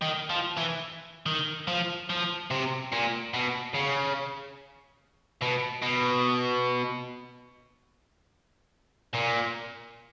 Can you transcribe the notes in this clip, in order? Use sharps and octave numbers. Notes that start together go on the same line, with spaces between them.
D#3
F3
E3
D#3
F3
F3
C3
A#2
B2
C#3
B2
B2
A#2